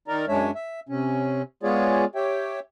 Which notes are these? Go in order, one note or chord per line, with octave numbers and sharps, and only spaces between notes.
D#3 D#4 A#4 D5 A#5
F#2 G#3 D4 C#5 E5
E5
C3 C#4
G#3 B3 F4 G#4 C#5 D5
G4 C#5 E5 G5